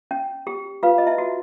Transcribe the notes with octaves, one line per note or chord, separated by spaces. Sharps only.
C#4
G4
F4 B4 F5
D#5
E4 E5
F#4